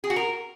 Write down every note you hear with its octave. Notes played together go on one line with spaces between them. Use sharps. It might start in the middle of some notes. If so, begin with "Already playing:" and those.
G#4
F#4
A#4